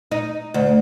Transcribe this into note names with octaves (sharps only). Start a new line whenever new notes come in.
D#4
D2